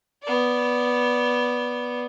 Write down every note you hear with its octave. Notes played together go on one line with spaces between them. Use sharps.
B3 D5